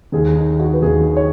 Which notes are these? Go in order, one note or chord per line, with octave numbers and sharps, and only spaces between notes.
D#2 D#3 G#4
D#4
F#4
B4
D#2 D#3 G#4
C#5